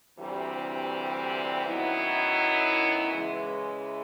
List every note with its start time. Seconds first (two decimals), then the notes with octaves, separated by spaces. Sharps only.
0.17 D2 C3 E3 G3
1.64 F#2 D#3 F#3 B3 E4
3.11 C#3 E3 G#3